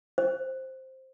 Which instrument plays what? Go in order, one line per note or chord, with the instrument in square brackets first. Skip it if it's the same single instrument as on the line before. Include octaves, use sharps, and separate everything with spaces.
[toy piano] C5